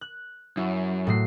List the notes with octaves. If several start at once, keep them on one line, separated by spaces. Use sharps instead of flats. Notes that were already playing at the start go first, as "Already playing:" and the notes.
F#6
F#2 E4
A2 F#3 C7